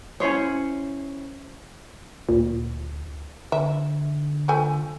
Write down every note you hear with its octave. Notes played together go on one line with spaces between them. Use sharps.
C#4 E4 C5 C#5
D2 A#2
D3 E5
F3 A3 G#5